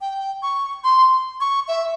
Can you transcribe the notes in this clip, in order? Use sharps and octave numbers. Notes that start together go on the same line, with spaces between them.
G5
C#6
C6
C#6
E5